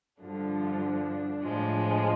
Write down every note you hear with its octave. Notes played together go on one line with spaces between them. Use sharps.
G2 D3 F3 D4
A2 F3 G#3